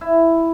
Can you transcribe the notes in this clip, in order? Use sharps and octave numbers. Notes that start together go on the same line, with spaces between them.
E4